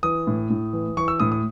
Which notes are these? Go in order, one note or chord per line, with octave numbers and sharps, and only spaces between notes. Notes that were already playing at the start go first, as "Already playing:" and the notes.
E3 D#6
A2
A2
E3
E3 C#6
E6
A2 D#6
D#6